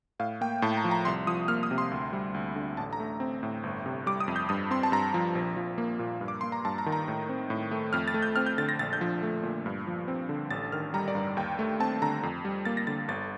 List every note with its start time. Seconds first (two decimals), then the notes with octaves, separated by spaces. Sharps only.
0.20 A2 F5
0.41 A#3 G5
0.62 A2 A5
0.77 A#5
0.84 F3
0.91 A#5
1.05 C2 C6
1.27 F3 D#6
1.48 A#3 F6
1.63 D#6
1.71 C3
1.78 C6
1.91 D2
2.13 G3
2.34 D2
2.56 D3
2.77 A1 A5
2.93 A#5
3.00 A3
3.20 C4
3.43 A2
3.63 G1
3.86 C3
4.06 G3 D6
4.20 D#6
4.28 F2
4.36 G6
4.49 G2 D#6
4.71 C4 C6
4.83 A5
4.92 G2 A#5
5.14 F3
5.35 A#1
5.56 F3
5.78 A#3
5.99 A#2
6.21 G2
6.28 D6
6.41 A#3 C6
6.52 A#5
6.65 G2 A5
6.78 A#5
6.86 D#3
6.92 A#5
7.08 A2
7.29 C4
7.50 A2
7.71 A3
7.93 F2 F6
8.08 A6
8.14 A3
8.22 G6
8.36 C4 F6
8.46 G6
8.58 D3 A6
8.69 A#6
8.79 A#1 A6
8.93 G6
9.01 F3
9.23 A3
9.43 A#2
9.66 G2
9.87 F3
10.08 C4
10.29 D3
10.50 A1 A6
10.72 D#3 F6
10.94 G3 A#5
11.08 D5
11.15 G2
11.37 D#2 G5
11.59 A3
11.80 C4 A5
12.02 D3 A#5
12.23 F2
12.45 G3
12.65 A#3 A6
12.77 A#6
12.87 D3 A6
13.08 G1 A6